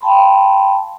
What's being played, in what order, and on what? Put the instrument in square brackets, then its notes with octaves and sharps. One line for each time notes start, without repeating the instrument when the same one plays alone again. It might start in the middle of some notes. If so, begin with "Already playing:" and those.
[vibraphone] F5 G5 A5 B5 C6